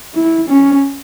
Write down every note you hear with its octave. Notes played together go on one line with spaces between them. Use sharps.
E4
C#4